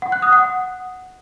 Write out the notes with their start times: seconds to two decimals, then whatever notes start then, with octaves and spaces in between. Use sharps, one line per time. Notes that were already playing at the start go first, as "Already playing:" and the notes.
0.02 F#5
0.12 F#6
0.22 D#6
0.33 F#5